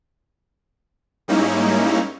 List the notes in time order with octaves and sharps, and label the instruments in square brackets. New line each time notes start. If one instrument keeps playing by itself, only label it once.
[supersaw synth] G#2 G3 A#3 C#4 D#4 E4